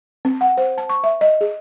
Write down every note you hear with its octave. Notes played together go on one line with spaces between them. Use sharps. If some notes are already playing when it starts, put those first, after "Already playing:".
C4
F#5
C5
A5
C#6
E5
D#5
G#4